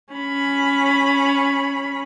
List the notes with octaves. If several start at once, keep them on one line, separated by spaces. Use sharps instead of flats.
C#4 B5